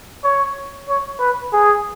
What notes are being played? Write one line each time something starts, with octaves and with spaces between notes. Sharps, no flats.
C#5
C#5
B4
G#4